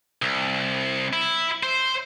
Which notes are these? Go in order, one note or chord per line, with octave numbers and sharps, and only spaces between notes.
C2
E4
C5